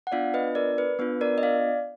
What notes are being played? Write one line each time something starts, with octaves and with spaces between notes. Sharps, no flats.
F#5
B3 D4 F4 D5 F5
B4 D#5
A#4 D5
B4
B3 D4 F4 B4
A#4 D5
D#5
D5 F5